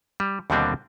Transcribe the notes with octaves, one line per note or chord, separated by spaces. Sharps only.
G3
D#2 B2 D3 G3 C4 D4